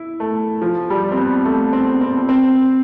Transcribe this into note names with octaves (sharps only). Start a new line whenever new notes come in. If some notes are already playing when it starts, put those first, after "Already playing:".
Already playing: E4
A3
F3
G3
C4
B3
A3
C4
C4
C4